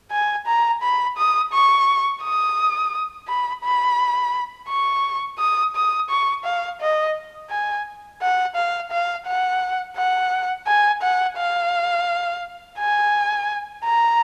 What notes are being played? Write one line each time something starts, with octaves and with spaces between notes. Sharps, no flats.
G#5
A#5
B5
D#6
C#6
D#6
B5
B5
C#6
D#6
D#6
C#6
F5
D#5
G#5
F#5
F5
F5
F#5
F#5
G#5
F#5
F5
G#5
A#5